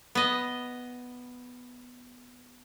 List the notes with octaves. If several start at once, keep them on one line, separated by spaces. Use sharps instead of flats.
B3 D#5